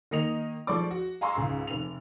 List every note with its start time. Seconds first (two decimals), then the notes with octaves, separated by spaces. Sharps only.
0.11 D#3 A#3 D#5 C#7 F7
0.67 F3 G#3 A3 D5 C#6 D6
0.91 F#4
1.21 F5 G#5 A#5 C6 C#6 E6
1.35 C#2 G#2
1.67 F1 F7